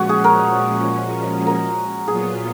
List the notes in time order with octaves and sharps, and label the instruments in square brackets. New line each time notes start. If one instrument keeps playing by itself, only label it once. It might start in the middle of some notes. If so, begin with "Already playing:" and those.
Already playing: [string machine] A#2 F3 G#3 C#4 [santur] F#4
[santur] G#4
A#4
A#4
[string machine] A#2 F#3 B3 F4 [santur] G#4